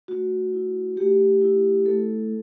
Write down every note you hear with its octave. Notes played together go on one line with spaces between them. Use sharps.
A3 F#4
E4
A3 G4
E4
A3 A4